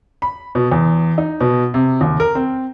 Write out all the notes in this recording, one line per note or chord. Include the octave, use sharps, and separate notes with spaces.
B5
B2
E2
D#4
B2
C3
D#2
A#4
C4